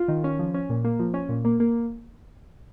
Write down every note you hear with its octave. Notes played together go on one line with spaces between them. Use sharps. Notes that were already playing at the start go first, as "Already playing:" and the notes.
Already playing: F4
D#3
C#4
F3
C#4
A#2
A#3
F3
C#4
A#2
A#3
A#3